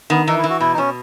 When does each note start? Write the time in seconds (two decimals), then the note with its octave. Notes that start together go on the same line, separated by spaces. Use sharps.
0.10 D#3 B3
0.27 E3 D#4
0.38 E4
0.44 E3
0.49 F#4
0.60 B2 E4
0.74 D#4
0.78 B2 C#4